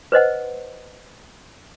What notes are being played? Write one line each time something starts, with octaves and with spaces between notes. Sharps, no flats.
B4 C5 D#5 F#5